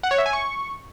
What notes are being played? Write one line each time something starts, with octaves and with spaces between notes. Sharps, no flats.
F#5
C#5
E5
G#5
C#6